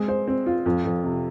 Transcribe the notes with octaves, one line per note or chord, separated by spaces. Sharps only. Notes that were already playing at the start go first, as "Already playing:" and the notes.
Already playing: G#3 C4
C5
C4
F4
F2
F2
C3